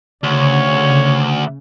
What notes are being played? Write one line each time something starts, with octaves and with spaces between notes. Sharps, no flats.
D2 C#3 C#5